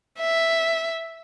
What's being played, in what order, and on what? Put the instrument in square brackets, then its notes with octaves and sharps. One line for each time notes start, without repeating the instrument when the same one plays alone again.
[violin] E5